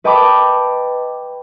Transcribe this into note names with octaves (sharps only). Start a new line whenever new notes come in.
B4 D#5 G5 A5 B5 D6